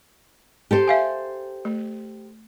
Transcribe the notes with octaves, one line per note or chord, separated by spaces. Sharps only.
G4 A4 C5
E5 F5 G#5
A3